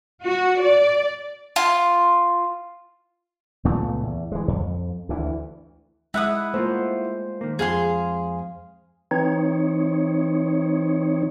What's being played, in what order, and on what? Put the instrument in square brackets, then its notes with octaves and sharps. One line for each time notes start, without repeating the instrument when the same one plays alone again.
[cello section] F#4
D5
[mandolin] F4
[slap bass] C#2 A#2 A3 B3
E2
E3 G#3
F2
D2 E3
[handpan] G#3 [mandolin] E4 F#5 D#6
[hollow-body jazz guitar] A3 A#3 F4 [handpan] C5
[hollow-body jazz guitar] D#3 A#3
[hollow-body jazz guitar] F2 [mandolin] G#4 F5 C6
[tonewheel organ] E3 C4 D#4 C#5